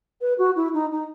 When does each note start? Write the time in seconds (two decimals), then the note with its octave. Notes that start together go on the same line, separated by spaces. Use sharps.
0.21 B4
0.38 F#4
0.56 E4
0.74 D#4
0.91 D#4